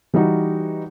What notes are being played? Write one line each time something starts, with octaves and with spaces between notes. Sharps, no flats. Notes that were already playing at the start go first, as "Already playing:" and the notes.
E3 G3 D#4 F#4